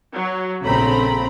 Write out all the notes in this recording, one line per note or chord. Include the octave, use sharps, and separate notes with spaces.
F#3
A#1 C#3 A3 C4 A#5 B5